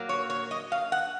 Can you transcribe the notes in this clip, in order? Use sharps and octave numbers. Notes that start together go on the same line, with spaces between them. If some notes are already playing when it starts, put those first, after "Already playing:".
Already playing: A#2 F#3 A#3
C#5
C#5
D#5
F5
F#5